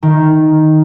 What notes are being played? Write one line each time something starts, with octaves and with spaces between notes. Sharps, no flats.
D#3